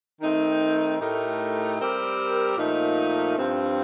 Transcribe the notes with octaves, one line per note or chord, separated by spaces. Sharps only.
D#3 A3 C4 D#4
A2 A3 D#4 G4 A#4
G3 C4 G4 A#4
A#2 F3 A3 D#4
G2 F3 C4